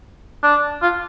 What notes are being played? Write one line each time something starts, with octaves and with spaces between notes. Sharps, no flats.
D4
F4